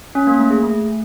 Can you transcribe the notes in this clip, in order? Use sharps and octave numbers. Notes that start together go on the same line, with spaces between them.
C#4
A#3
A3
G#4
A3